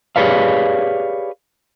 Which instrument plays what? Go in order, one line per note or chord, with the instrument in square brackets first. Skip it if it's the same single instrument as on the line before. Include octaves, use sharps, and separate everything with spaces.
[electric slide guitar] G4 G#4 B4 C#5 D5 F5